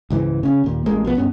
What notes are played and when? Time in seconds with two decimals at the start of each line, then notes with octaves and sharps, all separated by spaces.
0.10 C#2 G#2 E3
0.43 C#3 C#4
0.64 D#2 A#2
0.86 A1 G#3 A#3
1.05 B1 F3 B3
1.17 G2 B3 C#4